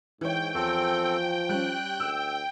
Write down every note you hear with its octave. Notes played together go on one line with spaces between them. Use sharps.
G#2 E3 C#5 G5
E2 F3 C4 A4 G5
G3 C#4 F#6
D2 E6